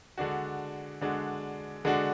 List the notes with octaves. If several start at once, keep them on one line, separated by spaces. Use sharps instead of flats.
D3 G#3 D4 F#4
D3 G#3 D4 F#4
D3 G#3 D4 F#4